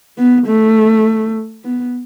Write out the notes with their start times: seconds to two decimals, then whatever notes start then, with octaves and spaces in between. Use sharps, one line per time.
0.18 B3
0.47 A3
1.64 B3